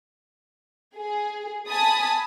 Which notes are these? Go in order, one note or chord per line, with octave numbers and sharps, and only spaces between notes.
G#4
G#5 A5 B5 D#6